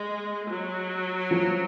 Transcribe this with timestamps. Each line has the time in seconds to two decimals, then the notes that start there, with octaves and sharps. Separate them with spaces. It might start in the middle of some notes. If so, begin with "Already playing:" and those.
Already playing: G#3
0.50 F#3
1.31 F3